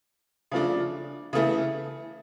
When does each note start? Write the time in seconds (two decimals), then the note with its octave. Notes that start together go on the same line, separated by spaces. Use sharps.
0.52 C#3 F3 A3 D4
1.33 C#3 E3 A3 E4